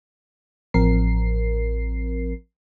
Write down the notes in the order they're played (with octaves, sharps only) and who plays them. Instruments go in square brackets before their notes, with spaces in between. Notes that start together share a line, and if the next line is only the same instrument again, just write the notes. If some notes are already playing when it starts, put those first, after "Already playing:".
[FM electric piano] A1 F3 C4 A#4 C7